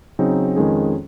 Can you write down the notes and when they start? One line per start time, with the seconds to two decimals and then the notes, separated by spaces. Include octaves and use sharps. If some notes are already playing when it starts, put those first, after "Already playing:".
0.19 C#3 F#3 C4 D#4
0.56 F2 D#3 G#3 C#4 G#4